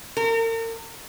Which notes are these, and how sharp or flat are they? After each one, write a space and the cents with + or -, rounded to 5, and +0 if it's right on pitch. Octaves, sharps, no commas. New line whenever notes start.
A#4 -40